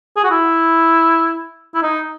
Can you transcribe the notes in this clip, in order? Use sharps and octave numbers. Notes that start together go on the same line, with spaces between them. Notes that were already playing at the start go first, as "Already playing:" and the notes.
G#4
F#4
E4
E4
D#4